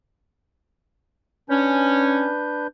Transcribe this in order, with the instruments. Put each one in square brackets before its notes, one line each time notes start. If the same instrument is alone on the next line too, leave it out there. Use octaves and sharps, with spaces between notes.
[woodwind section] C#4 [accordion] D4 B4 G6